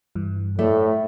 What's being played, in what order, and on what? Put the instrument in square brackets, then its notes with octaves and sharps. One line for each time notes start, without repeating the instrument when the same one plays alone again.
[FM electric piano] G2 E3
[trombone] A2 [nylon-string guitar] A3 [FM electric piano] D5